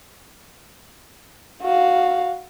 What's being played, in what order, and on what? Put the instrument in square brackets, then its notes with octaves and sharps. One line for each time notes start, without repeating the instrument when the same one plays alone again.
[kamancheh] F#4 F5